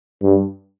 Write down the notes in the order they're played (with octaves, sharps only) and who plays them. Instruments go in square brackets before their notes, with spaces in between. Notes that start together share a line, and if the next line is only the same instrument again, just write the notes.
[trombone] G2